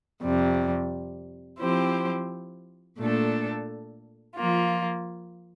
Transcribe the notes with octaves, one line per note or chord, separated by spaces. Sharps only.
F2 C3 G3
F3 C4 E4 G4 C5
A#2 A3 D4 A4
F3 A#3 F4